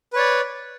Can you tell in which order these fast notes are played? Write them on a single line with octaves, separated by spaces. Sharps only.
B4 C#5 D5